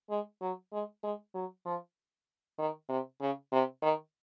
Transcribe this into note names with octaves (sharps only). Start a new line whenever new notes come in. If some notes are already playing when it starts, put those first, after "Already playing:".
G#3
F#3
G#3
G#3
F#3
F3
D#3
C3
C#3
C3
D#3